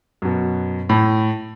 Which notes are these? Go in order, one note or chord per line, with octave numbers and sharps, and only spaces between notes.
F#2 B2
A2